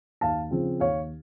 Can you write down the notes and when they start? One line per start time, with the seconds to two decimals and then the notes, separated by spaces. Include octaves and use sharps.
0.21 D#2 F5 A5
0.51 C#3 F3 C4
0.80 D#2 C#5 F5